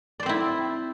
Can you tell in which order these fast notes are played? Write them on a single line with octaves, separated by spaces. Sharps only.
D5 C5 C4 E4